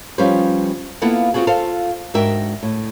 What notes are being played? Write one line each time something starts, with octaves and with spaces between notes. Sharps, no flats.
F3 G3 C#4 G4 B4 C5
A#3 B3 E4 F4 A4 F#5
B3 C4 F4 F#4 G#4
F4 A4 C5 F5
G#2 D4 F#4 A#4 E5 G5
A2